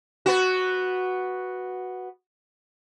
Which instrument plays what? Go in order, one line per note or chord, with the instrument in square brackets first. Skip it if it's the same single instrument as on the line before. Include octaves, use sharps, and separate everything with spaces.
[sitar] B3 F#4